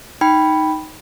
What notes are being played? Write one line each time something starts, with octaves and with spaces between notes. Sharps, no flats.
D#4 G5 B5